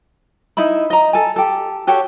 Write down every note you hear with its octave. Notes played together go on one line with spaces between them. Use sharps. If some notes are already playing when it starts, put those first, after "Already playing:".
D#4 E4 E5 B5
D#5 A#5
A4 G#5
G4 A4
F#4 G4 A4 C#5